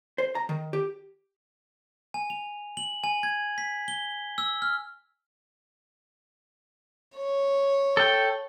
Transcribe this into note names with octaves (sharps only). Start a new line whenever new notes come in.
C5
A#5
D#3
G4
G#5
F7
F#7
G#5
G#6
B6
G7
E6
F6
C#5
A4 G5